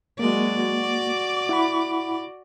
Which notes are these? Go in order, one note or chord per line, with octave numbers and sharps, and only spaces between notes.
F#3 G#3 A#3 F#4 D5
D6
E4 F#5 B5